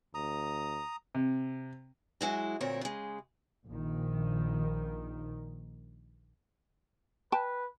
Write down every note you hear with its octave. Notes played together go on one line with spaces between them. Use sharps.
D2 A#5 D#6
C3
F#3 G#3 E4 F#4
D2 A#2 C4 A#4 C#5
C#3 G#3
A#1 D#3
B4 G5 A5